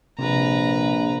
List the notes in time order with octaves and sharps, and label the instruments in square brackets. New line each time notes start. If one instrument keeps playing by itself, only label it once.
[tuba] A#1 [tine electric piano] C3 [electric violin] B4 A#5